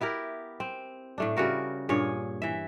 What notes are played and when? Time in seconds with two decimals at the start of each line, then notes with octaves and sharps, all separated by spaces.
0.01 B3 E4 G4 A#4
0.60 C4
1.18 A2 A3 D4
1.36 C#3 G3 F#4 A#4
1.89 G2 A#2 G#4 C#5
2.42 E3 E5